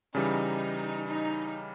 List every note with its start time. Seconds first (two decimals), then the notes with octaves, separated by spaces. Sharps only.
0.15 C#3 E3 G3 D#4
1.08 D#4